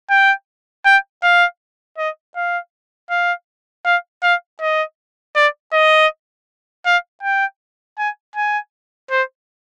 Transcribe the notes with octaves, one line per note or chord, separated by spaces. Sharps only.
G5
G5
F5
D#5
F5
F5
F5
F5
D#5
D5
D#5
F5
G5
G#5
G#5
C5